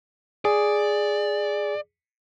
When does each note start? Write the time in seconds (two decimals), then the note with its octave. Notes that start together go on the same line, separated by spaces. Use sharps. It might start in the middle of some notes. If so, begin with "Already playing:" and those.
0.45 G#4 D5